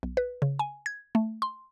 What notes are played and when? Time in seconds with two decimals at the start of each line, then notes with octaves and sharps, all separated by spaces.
0.03 B1
0.17 B4
0.42 C#3
0.59 G#5
0.86 G#6
1.15 A3
1.42 C6